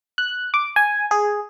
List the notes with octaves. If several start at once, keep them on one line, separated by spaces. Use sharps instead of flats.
F#6
D6
G#5
G#4